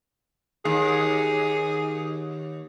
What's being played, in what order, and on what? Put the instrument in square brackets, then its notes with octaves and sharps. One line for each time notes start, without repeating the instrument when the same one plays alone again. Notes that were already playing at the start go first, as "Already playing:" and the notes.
[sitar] D#2 [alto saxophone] G#4